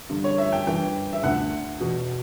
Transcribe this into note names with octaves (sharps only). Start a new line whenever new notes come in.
G2 D3
C#5
E5
G5
G2 E3 G5
E5
D2 D3 F#5
E2 B2